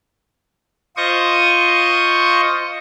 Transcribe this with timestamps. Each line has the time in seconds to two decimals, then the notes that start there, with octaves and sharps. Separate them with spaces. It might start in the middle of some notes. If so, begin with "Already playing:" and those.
0.97 F4 C5 D#5 C#6 D#6